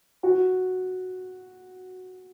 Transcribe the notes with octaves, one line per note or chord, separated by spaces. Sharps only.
F#4